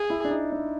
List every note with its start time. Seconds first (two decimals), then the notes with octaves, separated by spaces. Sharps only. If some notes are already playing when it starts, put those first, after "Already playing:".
Already playing: G#4
0.10 E4
0.24 D4
0.31 D#4
0.52 D4